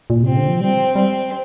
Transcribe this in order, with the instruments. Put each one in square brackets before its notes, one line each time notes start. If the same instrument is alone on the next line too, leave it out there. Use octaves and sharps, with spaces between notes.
[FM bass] A#2
[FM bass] C3 [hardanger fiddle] C4
[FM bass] D3
F3
[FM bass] G3 [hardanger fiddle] C4
[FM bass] G3 [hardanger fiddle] C4